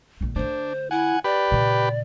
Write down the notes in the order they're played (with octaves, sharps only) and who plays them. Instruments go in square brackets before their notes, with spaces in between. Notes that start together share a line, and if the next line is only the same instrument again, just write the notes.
[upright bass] A#1 C#3
[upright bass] D3 A3 [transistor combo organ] D4 [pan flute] C5
[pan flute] E4 [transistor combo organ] F#5 G#5
[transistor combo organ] G4 B4 B5 [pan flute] D5
[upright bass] A#2 C#3